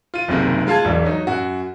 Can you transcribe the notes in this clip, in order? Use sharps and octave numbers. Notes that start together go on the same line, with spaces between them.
F4 D#7
F#1 B1 C3 D#3
G#3 F4 F5 A5 G#6
E1 B1 D4
F#3 D#4
F#2 F#4